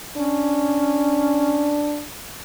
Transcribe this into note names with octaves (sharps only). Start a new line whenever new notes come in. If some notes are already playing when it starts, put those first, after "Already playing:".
C#4 D4